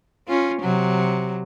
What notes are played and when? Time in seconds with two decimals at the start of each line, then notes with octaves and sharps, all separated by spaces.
0.28 C#4 F4
0.62 C3 F#3